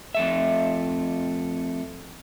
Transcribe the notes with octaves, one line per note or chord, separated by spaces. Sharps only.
F2 A3 E5